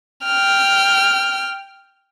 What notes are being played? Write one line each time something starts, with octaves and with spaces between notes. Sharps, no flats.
G5 F6